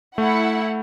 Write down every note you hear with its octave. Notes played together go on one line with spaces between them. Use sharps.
A3 E4 F#5